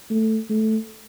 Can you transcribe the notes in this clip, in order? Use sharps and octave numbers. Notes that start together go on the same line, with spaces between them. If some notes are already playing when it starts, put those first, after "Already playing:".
A3
A3